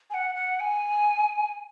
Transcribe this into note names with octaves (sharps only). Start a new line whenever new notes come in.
G#5
F#5
F#5
G#5